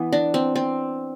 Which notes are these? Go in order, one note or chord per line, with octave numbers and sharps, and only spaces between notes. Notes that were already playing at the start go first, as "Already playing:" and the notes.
Already playing: E3 B3
D4
C4
C4